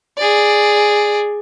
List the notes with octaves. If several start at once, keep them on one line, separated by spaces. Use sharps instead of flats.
G#4 D5